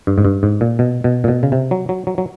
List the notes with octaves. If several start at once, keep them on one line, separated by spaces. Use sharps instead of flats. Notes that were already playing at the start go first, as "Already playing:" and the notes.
G2
G#2
G2
G#2
A#2
B2
B2
A#2
B2
C#3
C3
F#3
F#3
F#3
F#3